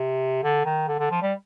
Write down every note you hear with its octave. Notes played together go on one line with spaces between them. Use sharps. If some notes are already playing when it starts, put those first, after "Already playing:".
Already playing: C3
D3
D#3
D3
D3
F3
G3